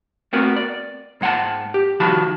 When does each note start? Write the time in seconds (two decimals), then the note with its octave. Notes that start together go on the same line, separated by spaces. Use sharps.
0.33 A3 B3 C4 F#4 A#4 B4
0.57 D5
1.21 G#2 G#3 F#5 G5 A5
1.74 G4
2.00 C2 D#3 F3 F#4 A5 B5